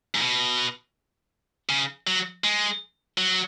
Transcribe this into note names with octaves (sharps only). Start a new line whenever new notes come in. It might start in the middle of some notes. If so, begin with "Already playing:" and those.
G#2
B2
C#3
F#3
G#3
F#3